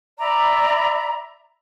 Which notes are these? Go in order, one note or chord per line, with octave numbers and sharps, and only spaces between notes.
D5 E5 A#5 B5